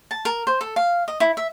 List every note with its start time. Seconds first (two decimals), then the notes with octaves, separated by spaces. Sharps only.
0.11 A5
0.25 A#4
0.47 C5
0.61 A4
0.76 F5
1.08 D#5
1.20 E4
1.37 E5